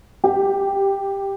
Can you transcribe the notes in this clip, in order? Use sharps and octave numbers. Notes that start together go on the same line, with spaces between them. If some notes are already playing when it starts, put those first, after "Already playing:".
G4